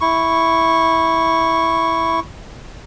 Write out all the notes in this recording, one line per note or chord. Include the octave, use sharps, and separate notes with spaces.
E4 C#6